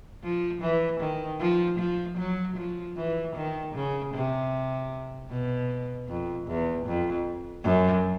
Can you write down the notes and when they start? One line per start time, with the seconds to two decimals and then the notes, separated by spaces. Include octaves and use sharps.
0.23 F3
0.62 E3
1.00 D#3
1.40 F3
1.79 F3
2.18 F#3
2.57 F3
2.97 E3
3.36 D#3
3.75 C#3
4.14 C3
5.30 B2
6.08 F2
6.47 E2
6.86 F2
7.64 F#2